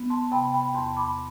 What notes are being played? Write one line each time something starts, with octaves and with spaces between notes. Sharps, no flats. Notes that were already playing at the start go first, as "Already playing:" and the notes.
Already playing: B3
A5 C6
C3 G5 B5
G5 B5
E2 A5 C6
B5 D6